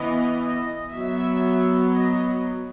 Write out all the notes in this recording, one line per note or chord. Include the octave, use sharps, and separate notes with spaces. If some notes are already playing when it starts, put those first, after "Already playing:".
Already playing: E3 B3 D#5
D#5
F#3 B3 E5
D#5